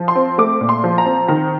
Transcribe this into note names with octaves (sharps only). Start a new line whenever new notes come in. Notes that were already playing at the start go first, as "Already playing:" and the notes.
Already playing: F3
C6
C4
A3 D6
A#2
C6
F3
A#5
C4
D#3 A#5